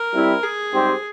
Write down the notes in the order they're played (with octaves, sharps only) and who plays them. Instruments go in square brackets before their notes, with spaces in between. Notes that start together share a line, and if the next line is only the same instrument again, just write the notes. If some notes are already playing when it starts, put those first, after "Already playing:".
Already playing: [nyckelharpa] A#4
[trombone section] G3 C4 E4
[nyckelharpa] G#4
[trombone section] G#2 G3 C4 G4 C5